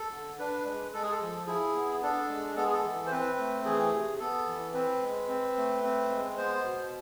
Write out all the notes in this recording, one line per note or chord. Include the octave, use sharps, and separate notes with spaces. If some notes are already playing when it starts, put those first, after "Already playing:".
Already playing: A4
D3
D4 B4
G#3
G#3 A4
G#4
A4
F3
E4 G#4
B3
D4 A4
G#3
B3 A4
G#4
A4
E3
C5
C4 B4
A3
E3 G#4
C3
B3 A4
E3
C4 B4
G#3
C4
A3
C4
G#3
B3 C5
B2